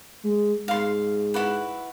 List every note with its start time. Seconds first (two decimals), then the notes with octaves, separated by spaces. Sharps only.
0.24 G#3
0.68 G#2 F5 C6
1.34 E4 F#4 B4